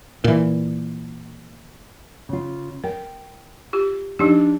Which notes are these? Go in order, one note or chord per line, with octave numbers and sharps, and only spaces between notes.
A#2 E3
C#3 F4
A#4 G5
F4 G4
F3 D4 D#4 G4